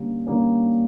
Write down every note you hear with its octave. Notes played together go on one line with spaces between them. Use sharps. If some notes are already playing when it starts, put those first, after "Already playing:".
Already playing: D3 G3 A#3 C#4
D3 G3 A#3 C#4